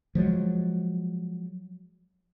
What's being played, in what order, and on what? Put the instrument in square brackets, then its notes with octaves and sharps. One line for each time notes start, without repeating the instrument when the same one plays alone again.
[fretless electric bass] F3 F#3 G#3